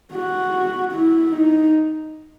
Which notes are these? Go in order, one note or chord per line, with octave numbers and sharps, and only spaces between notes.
F#4
E4
D#4